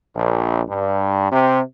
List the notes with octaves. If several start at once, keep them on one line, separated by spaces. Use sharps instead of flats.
A#1
G2
C3